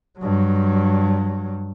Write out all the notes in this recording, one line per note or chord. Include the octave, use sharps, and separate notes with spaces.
G2 F#3